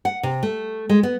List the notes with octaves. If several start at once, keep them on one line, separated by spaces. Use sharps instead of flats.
F#5
C3
A3
G#3
B3